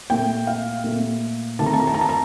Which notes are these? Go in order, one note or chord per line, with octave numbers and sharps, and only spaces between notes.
A#2 A3 G5
F5
A#2 A3
C3 D#3 A3 A5
A#5
A5
A#5
A5
A#5
A5
A#5